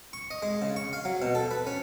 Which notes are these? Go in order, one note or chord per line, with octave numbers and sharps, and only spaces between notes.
C#6
D#5
G#3
C#3
C#6
F5
F#3
B2
A4
B4
C#4